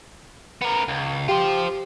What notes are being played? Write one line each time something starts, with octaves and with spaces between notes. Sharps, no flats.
B3 A#4
C#2
F4 G4 C5